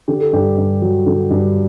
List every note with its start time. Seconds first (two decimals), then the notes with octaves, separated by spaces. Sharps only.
0.08 D3 G4
0.21 A4
0.33 G2 G4
0.57 G2
0.82 F#3
1.06 D3
1.31 G2